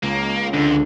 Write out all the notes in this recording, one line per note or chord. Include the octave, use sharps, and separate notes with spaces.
C#2 A#3
F2 D3